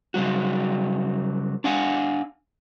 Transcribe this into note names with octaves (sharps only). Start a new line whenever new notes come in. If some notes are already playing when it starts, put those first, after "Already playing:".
C#3 F#3 G3 F#4
D4 F5 F#5 G#5